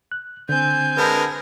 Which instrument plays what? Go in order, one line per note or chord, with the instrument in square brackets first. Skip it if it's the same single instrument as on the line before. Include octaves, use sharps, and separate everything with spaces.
[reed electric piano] F#6
[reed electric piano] D3 [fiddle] C4 G#5 [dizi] G6
[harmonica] D3 G#3 A#4 [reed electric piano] B4 A5 B5